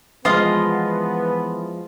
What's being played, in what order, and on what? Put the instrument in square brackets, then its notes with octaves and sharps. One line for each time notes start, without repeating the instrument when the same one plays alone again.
[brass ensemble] E3 B3 [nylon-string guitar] F3 G#3 [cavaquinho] F4 D#5 F5